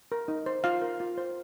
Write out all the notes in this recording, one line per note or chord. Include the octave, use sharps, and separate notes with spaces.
A#4
D#4
C5
F4 F5
A#4
F4
C5